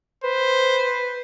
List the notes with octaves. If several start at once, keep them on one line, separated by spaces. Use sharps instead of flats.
B4 C5